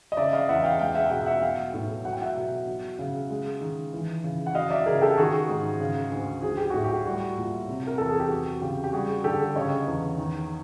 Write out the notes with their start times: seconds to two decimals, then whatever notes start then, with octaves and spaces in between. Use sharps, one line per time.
0.12 D#5
0.17 C#3 D5 E5
0.33 D#5 F5
0.49 E2 E5 F#5
0.64 F5 G5
0.79 G#3 F5 G5
0.95 E5 F#5
1.06 G5
1.11 B2 E5 F#5
1.26 E5 F#5
1.42 F#3 F5 G5
1.73 A2
2.05 F#3 F#5
2.13 G5
2.22 E5 F#5
2.37 B2
2.67 F#3
2.99 C#3
3.30 G#3
3.61 D#3
3.93 E3
4.24 C#3
4.47 F#5
4.55 F#3 D#5 F5
4.71 D5 E5
4.86 C#3 G#4 A#4
5.01 G4 A4
5.18 D#3 F#4 G#4
5.49 G#2
5.80 C#3
6.12 D2
6.42 F#3 G#4
6.57 G4
6.70 A2 F#4
6.84 G4
7.05 G3 F#4
7.37 A#2
7.68 C3
7.87 A#4
7.98 E2 A4
8.08 G#4
8.20 G4
8.30 F#3 F#4
8.61 C#3 G4
8.84 G4
8.93 G3 F#4 G#4
9.24 D3 G4 A4
9.55 C#3 C#5 D#5
9.87 E2
10.18 D#3